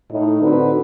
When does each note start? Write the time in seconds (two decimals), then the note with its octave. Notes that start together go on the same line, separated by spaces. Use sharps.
0.10 A2 D#4
0.42 D3 C4 F#4 B4